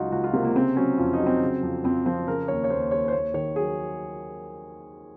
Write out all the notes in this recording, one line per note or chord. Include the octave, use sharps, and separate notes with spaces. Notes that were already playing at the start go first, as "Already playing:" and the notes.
Already playing: C#2 F#3 D#4 F4 F#4
C#2 F#4
F4
C3 A#3
A#3
C#3 C4
F#3 C#4
F2 F4
D#4
F#3
C4
C#3
F2
F2 C4
F3 C4
C#3 A#4
D#2 C#5
C#5
D#2 C5
D#2 C#5
C5
D#2 C#5
D#3 C#5
F#3 G#4